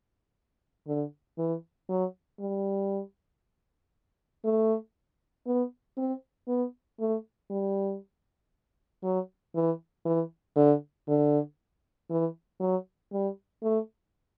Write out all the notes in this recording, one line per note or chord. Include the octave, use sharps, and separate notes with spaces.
D3
E3
F#3
G3
A3
B3
C4
B3
A3
G3
F#3
E3
E3
D3
D3
E3
F#3
G3
A3